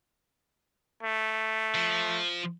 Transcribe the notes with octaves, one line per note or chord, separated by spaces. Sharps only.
A3
F3